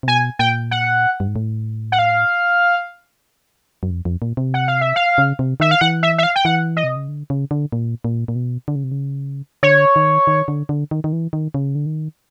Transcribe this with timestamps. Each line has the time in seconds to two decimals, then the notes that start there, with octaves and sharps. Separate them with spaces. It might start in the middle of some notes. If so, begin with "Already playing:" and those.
0.03 C3
0.08 B2 G#5
0.39 A#2 G5
0.71 F#5
1.20 G2
1.28 G#2
1.36 A2
1.92 F#5
1.99 F5
3.83 F#2
3.91 F2
4.05 F2
4.22 A#2
4.37 C3
4.54 F#5
4.68 F5
4.81 E5
4.96 F5
5.18 C#3
5.39 C3
5.60 D#3 E5
5.71 F5
5.81 E3 F#5
6.03 E5
6.18 E5
6.23 F5
6.36 G5
6.45 E3 F#5
6.77 D#5
6.84 C3
6.96 C#3
7.08 D3
7.30 C#3
7.51 D3
7.72 A#2
8.04 A#2
8.28 A#2
8.35 B2
8.68 D3
8.76 C#3
8.84 C3
8.92 C#3
9.63 D3 C#5
9.96 D#3
10.27 D#3
10.48 D3
10.69 D3
10.91 D#3
11.04 D#3
11.13 E3
11.33 D#3
11.54 C#3
11.75 D3
11.86 D#3